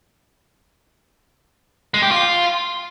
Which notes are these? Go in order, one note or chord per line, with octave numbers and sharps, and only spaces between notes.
G#3
G4
F4